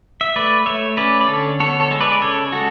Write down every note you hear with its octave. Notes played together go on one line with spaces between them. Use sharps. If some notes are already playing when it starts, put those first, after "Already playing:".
E5
A3 B4 D5
A3 C#5 E5
C#4 B4 D5
D5
D3 A4 C#5
B3 A4 C#5
A4 C#5
G#3
B4 D5
D5
C#3 A4 C#5
G#3 F#4 A4